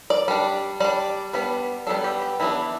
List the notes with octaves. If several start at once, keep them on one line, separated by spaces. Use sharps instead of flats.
D5
G3 D4
G3 D4 D5
G3 B3 D4 B4
G3 B3 D4 A4
G4
G4
E3 B3 D4 E4